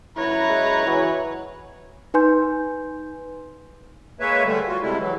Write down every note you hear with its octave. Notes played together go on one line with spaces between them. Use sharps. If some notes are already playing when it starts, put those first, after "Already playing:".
F#2 E4 B4 C#5 F#5 A#5
G#3
E3 F#3
D#4 B4 G#5 C6 G6
G#3 A#3 B4 C#5 E5
D3 G3 A3
F4 F#4
C3 G3 G#3 E4
E3 F#3